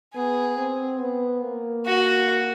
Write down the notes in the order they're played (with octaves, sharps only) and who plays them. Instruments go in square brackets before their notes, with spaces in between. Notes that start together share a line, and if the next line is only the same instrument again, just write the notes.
[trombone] B3 [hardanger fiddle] G#4
[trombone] C4
B3
A#3
[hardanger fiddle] F#4